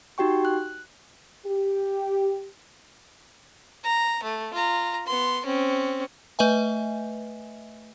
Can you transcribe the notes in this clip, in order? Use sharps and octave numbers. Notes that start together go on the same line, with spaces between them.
D#4 F#4 G4 G5 C#6
F#6
G4
A#5
A3
F4 A#5
B3 C6
C4 C#4
A3 B4 D#5 E5 G#5